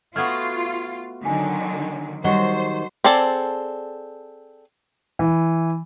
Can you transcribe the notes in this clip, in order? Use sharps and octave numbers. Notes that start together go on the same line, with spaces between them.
A3 B3 F4 F#4 F6 G#6
D3 D#3 F#3 G#5
D#3 F#3 G3 F#4 C5 D#5 G7
C4 G#4 A4 D5 A5
E3